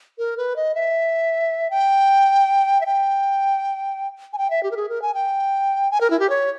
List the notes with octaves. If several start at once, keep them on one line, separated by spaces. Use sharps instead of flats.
A#4
B4
D#5
E5
G5
E5
G5
G#5
G5
E5
G4
A#4
G#4
A#4
G#5
G5
G#5
A#4
E4
G4
C#5